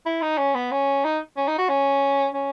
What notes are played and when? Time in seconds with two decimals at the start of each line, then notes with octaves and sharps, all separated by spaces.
0.06 E4
0.22 D#4
0.38 C#4
0.55 B3
0.72 C#4
1.04 D#4
1.37 C#4
1.48 D#4
1.58 F#4
1.69 C#4
2.34 C#4